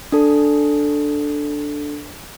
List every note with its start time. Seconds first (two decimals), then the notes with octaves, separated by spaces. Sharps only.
0.12 D4 A4